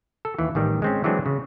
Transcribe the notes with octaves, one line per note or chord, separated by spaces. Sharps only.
A4
D#2 E3
A1 D#3 G3
G#3 C4 C#4
E3 F#3 G#3 A3 C4 D4
C#3